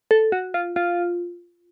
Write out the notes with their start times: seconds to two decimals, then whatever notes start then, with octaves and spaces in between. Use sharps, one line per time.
0.11 A4
0.32 F#4
0.54 F4
0.76 F4